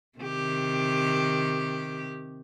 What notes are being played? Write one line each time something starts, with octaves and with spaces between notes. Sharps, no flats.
C3 D#3 G4